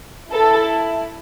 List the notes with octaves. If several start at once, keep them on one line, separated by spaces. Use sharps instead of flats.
E4 A4